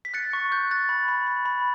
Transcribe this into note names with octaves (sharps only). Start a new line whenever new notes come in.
B6
F#6 A6 C#7
C#6
F#6 G6
F#6 A6
B5
B5
B5
B5